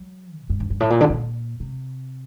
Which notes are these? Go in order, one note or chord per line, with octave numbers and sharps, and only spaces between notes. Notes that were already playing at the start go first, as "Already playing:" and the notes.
Already playing: F#3
A#2
G2
G2
G2
A2
A#2
D3
A#2
C3